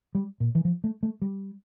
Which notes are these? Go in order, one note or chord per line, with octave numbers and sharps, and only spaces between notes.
G3
A#2
E3
F3
A3
A3
G3